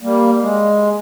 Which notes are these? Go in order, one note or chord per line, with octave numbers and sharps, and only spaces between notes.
G3 A#3
G#3